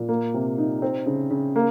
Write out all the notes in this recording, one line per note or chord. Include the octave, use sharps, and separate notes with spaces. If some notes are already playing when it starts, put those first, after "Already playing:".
Already playing: A#2
A#3
C3
D#4
C4
C#3
C#3
A#3